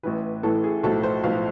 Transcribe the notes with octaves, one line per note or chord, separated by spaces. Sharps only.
A1 A2 E3 B4
A1 A2 E3 A4
G#4
B1 A2 F3 A4
C5
B1 A2 F3 F5